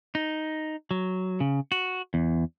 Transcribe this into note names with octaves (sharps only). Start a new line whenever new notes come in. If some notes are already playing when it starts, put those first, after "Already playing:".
D#4
F#3
C#3
F#4
E2